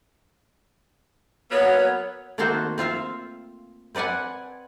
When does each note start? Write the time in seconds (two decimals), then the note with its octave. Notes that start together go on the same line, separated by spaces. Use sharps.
1.51 F#3 A#3 B3 C#5
2.38 D#3 A3 A#3 C4 F#4 C5
2.78 C4 F4 E5 F5
3.95 C4 B4 D5 F#5 G#5